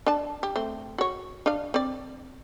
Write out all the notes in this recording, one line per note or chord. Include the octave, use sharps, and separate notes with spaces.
D4 A5
G4
A3 C4
F#4 C#5
D4 F5
C4 D5